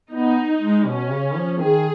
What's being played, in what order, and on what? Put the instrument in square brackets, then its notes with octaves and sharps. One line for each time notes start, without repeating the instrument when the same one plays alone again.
[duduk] B3 [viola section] D#4
[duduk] G#3
[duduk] B2 [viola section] C#4
[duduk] C#3
F3
[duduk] D#3 [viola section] G#4